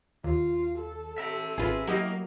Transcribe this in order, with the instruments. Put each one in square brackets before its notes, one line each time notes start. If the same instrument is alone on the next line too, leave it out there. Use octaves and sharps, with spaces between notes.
[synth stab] D#2 [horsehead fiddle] F4
[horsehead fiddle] A4
[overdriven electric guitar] E5 A#5
[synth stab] G#1 F4 [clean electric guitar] G#4 B4
[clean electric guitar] F#3 [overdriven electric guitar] A#3 [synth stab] E4 G4 D#5